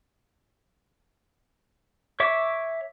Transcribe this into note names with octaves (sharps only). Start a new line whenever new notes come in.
C#5 E5 D6